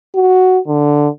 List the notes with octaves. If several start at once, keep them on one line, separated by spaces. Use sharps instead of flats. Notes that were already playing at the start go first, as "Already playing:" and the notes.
F#4
D3